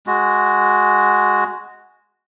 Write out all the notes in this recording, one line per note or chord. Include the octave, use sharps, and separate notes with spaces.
G#3 F#4